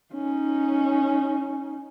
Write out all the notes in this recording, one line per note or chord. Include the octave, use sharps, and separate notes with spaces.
C#4 D#4